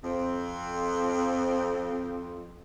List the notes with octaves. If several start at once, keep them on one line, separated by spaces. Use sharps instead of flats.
F2 C4